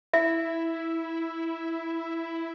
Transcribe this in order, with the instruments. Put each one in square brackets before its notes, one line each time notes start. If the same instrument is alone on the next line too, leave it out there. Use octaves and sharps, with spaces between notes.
[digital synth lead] E4 [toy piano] E5